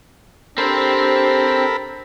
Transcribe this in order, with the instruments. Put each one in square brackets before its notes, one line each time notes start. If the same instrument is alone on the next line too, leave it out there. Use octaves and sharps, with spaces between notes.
[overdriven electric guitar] C4 C5 [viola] D4 G4 [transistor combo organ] A4 A#4 B5